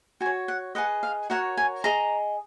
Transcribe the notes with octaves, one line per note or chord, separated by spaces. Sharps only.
F#4 G#5
C#5
F#5
G#4 B4 D#5 F#5
F5
F#4 A#4 C#5 F#5
G#5
G#4 D#5 A#5